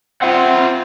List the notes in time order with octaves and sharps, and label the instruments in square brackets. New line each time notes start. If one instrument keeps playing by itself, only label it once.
[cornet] C4 [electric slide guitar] F4 E5 F#5